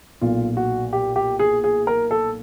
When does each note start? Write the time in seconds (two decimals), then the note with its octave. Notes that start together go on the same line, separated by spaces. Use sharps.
0.21 B1 A#2 F4
0.57 F#4
0.93 G4
1.16 G4
1.39 G#4
1.64 G#4
1.87 A#4
2.11 A4